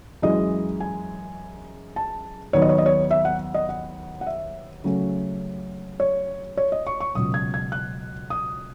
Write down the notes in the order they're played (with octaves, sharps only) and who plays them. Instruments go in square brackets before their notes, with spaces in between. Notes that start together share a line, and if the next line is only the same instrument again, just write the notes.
[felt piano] F#2 E3 G#3 D#5
G#5
A5
D#2 D#3 F#3 B3 C#5
D#5
C#5
D#5
C#5
E5
F#5
D#5
F#5
F#5
E5
C#3 F#3 A3 C#4
C#5
C#5
D#5
C#6
C#6
C#2 B2 F#3 D#6
G#6
G#6
F#6
D#6